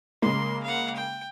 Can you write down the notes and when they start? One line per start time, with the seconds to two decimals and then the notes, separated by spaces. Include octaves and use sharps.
0.22 C#3 G#3 A#3 C6
0.64 F5 F#5
0.96 G5